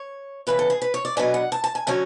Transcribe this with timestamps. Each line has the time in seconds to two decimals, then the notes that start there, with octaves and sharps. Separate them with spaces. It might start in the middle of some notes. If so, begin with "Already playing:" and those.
Already playing: C#5
0.47 C#3 E3 B3 B4
0.59 A4
0.70 G#4
0.82 B4
0.94 C#5
1.05 D5
1.17 B2 F#3 B3 D4 G#5
1.34 F#5
1.52 A5
1.64 A5
1.75 G#5
1.87 D3 F#3 C#4 G#5